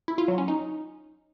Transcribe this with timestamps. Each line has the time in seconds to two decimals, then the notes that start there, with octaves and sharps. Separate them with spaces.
0.08 E4
0.18 F4
0.28 F#3
0.38 C#4
0.48 D#4